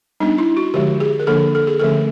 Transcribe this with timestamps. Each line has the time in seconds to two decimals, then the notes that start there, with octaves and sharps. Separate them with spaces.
0.20 G3 B3 D4 D#4
0.38 E4
0.57 F#4
0.74 D3 F3 G#3 G4
1.00 G#4
1.20 A#4
1.27 D3 F3 A#3 D4 A4
1.55 A4
1.67 G#4
1.79 D3 F3 A3 C#4 A4